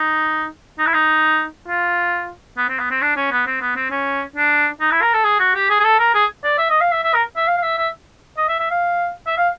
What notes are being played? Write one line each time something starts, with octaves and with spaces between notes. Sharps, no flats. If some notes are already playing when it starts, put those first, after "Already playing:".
Already playing: D#4
D#4
E4
D#4
F4
B3
C4
B3
C4
D4
C#4
B3
C4
B3
C4
C#4
D4
D#4
E4
A#4
A4
G#4
F#4
G4
G#4
G#4
A4
A#4
G#4
D5
E5
D#5
F5
E5
E5
A#4
E5
F5
F5
E5
E5
D#5
E5
E5
F5
E5
F5